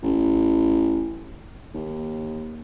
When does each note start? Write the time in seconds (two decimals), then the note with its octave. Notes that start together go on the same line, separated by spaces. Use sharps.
0.03 A1
1.74 D#2